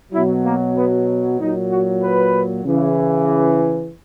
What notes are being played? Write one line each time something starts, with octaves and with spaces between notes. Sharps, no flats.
B2 F#3 E4
A#3
B3
A#2 F#3 D#4
F#4
B4
C#3 E3